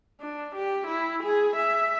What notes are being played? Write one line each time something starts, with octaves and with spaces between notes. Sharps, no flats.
D4
G4
E4
G#4
E5